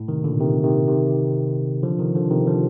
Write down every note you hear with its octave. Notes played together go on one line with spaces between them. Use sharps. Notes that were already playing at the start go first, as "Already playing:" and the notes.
Already playing: A2
C3 D#3
A#2 D3
C3 D#3
C3 D#3
C3 D#3
D3 F3
C3 D#3
D3 F3
C3 D#3
D3 F3